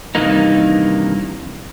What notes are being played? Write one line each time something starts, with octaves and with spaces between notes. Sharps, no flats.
G2 C3 D#3 E3 A#3 D#4